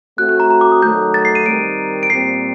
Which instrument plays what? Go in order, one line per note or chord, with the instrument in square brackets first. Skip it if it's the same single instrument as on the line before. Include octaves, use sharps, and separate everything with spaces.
[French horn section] A3 C4 F#4 [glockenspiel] F#6
[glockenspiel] F#6
A#5
A#5
D6
D#6
[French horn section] D#3 F#3 A3 [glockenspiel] G6
[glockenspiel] A6
C7
D#7
[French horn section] D#3 G3 C4 G4 A#4 [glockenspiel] D7
[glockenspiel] D7
[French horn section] A#2 G3 C4 G4 [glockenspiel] C7